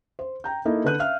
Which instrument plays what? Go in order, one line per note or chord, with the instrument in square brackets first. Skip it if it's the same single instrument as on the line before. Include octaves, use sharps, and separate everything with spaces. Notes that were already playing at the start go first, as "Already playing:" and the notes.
[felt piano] C5
G5 A#5 G6
A#3 D#4 E4 A4 D#5
D3 D4 B4 F#6 G6 D#7
E5 F5 F6